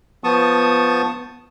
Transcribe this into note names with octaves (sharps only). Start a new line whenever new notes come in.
F3 B3 A5 C#6 D#6